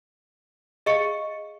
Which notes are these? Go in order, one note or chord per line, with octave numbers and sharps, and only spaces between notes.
G#4 D#5 F5 C#6 C#7